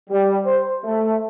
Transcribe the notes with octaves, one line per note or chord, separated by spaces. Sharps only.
G3
C5
A3